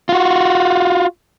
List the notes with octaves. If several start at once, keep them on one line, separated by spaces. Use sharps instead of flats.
F4 F#4